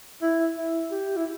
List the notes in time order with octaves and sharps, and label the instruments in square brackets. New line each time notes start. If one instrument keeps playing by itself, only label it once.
[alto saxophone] E4
E4
G4
E4